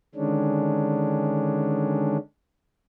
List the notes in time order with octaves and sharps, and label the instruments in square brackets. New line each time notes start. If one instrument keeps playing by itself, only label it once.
[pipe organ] D3 D#3 G#3 C#4 D4